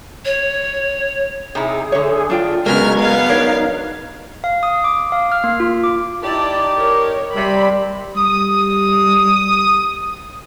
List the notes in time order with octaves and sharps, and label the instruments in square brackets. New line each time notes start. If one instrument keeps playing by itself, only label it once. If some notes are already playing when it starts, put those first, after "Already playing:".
[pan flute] C#5
[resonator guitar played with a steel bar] C3 D#4 E4 [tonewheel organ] G#4
[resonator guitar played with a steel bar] D3 A3 [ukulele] C#5
[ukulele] D4 F4 G5
[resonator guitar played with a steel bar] C#3 F#3 [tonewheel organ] G#3 A#4 G#6 [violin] B3 F6
[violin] B3 F5
[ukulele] D4 A#4 C#5 [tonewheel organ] D#4
[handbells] F5
D#6
D6
F5
F6
A#3
F4
D6
[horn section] D#4 G4 [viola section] E4 D5 A5
[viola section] A#4 C#5
[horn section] C3 [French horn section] G3 [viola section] B5
[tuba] G3 [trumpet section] D#6